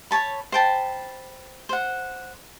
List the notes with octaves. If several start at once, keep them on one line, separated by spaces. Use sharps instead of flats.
C#5 A5 B5
C5 G5 A5 B5
C5 F#5